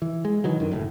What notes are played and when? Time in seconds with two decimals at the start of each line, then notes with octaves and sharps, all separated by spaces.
0.02 E3
0.25 G#3
0.44 D#3 E3 F#3
0.60 F#2 D3 D#3
0.71 F#1 A2